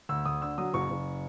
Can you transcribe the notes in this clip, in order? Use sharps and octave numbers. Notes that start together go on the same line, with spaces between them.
D2 E6
D2 D#6
D3 E6
F#3 D#6
F#1 C#6
F#1